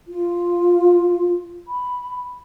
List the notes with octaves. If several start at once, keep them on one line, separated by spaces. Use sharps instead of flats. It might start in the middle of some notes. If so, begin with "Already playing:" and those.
F4
B5